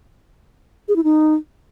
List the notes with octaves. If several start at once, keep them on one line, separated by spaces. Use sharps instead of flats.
G#4
E4
D#4